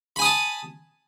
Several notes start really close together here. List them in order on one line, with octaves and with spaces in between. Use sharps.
B5 G#5 D#6 A5